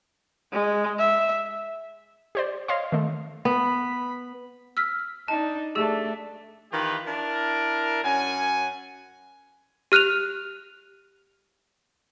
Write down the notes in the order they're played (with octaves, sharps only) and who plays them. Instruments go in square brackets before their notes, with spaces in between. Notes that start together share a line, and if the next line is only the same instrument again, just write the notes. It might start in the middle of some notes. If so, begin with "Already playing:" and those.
[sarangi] G#3
E5
[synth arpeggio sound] G4 C5 D5
C#5 D#5 F5 C6
D#3 A3
[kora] B3 [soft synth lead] B5
[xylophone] E6 F6 B6
[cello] D4 D#4 [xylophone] A5
[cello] A3 D4 [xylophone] G4 G#4 E6
[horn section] D#3 E3 F4 G4 B4
D4 E4 A#4
F#2 C#4 F#5 G#5
[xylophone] G4 F6 F#6 D#7 F7